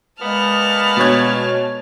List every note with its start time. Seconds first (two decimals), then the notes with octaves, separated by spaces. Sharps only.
0.21 A#2 G#3 B3 A5 F6
0.97 B2 C#5 G#6